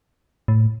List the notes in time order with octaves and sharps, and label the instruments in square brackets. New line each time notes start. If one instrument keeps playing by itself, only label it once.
[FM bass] A2